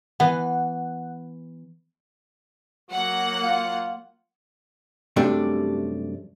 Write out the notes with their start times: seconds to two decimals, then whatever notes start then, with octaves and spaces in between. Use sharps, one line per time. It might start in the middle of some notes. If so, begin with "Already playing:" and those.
0.20 E3 B3 F#5
2.92 F#3 A#3 F#5
3.43 F4
5.16 F#2 C3 G3 A3 D4